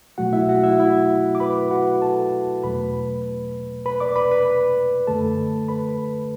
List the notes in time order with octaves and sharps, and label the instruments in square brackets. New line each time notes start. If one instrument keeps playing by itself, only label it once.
[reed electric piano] B2 F#3 A3 F#4 F#5
E4 E5
F#4 F#5
E4 E5
E4 E5
D6
B4 B5
F#4 F#5
A4 A5
E2 B2 F#3 A3 B4 B5
B4 B5
D5 D6
B4 B5
B4 B5
F#2 D3 A3 A4 A5
B4 B5